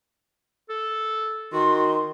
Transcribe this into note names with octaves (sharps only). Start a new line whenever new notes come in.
A4
D#3 F#4 C6